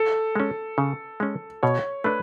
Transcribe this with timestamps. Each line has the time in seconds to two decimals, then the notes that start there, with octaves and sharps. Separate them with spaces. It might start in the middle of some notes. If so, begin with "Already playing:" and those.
Already playing: A4
0.36 G#3 C#4
0.78 C#3
1.20 G#3 C#4
1.63 B2 C#5
2.04 A3 D4 B4